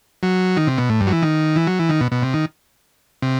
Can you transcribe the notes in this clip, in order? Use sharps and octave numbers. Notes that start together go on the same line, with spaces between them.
F#3
D#3
C3
B2
A2
G2
F#3
E3
D#3
E3
F#3
E3
D#3
B2
B2
C3
D#3
C3